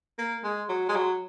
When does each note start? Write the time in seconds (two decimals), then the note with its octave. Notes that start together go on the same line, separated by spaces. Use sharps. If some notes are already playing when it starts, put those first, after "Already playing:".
0.18 A#3
0.44 G#3
0.69 F#3
0.89 G#3
0.96 F#3